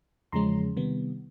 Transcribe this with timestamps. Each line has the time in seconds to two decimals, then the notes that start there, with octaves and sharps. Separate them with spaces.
0.32 E2 C#3 F3 G#3 C#4 A#5 C6
0.77 C3 D#3 G3 B3